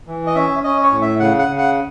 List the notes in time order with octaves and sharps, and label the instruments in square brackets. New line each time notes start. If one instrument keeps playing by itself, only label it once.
[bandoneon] E3
D#5
C#4 E5
C#4 D#5
C#5
A2
E5
C#3 F#5
F#5
C#3
F#5